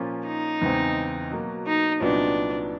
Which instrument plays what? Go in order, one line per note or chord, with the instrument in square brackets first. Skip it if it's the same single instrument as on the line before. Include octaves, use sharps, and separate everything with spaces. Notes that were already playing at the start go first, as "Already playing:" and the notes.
Already playing: [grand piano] A#2 F3 A#3 C#4 F4
[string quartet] D#4
[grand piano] E2 C#3 E3 G#3 C4
B2 F#3 A#3
[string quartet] D#4
[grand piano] C2 A#2 F#3 B3 D#4 [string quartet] D4